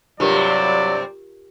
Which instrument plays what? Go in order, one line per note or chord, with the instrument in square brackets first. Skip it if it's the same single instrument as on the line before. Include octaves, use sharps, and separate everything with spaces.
[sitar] G2 C3 C4 [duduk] F#3 [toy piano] F4 G4 A#4 [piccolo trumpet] D5